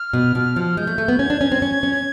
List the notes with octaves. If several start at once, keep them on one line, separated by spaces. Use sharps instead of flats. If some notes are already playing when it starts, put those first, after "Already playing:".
Already playing: F6
B2
B2
F3
G#3 G6
A3
A3
B3
C#4 G#6
D4
C#4
C4
C#4
C#4